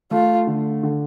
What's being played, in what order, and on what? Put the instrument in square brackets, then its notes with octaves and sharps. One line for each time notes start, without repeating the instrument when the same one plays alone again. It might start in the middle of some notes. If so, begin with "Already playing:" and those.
[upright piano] A3 [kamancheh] F4
[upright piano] D3
D3